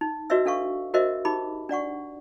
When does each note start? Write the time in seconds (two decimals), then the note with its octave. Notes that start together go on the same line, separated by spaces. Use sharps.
0.01 D#4
0.30 F#4 B4 C#5 D#5 E5 E6
0.45 D4 A4 F5 C#6
0.94 F#4 A#4 C5 D#5 E5
1.25 D#4 G4 B5 D6
1.69 D4 D5 F#5 C#6